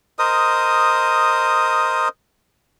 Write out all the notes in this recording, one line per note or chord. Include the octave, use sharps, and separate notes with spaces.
A#4 C5 D#5 D#6